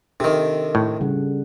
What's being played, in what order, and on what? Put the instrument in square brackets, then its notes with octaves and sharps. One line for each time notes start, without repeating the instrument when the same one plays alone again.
[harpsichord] C3 D#3 [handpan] D4 A4
[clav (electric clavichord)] A2
[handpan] C#3 G3 F#5